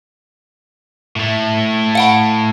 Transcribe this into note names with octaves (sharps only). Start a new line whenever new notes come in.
A2 A3
F5 F#5 B5